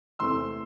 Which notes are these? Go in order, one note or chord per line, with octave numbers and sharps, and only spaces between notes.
E2 C3 E3 A3 C4 C6 E6